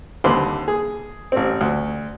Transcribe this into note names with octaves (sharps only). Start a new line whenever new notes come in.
D#2 D3 C4 B4 B5 C6
G#4
A1 C4
D2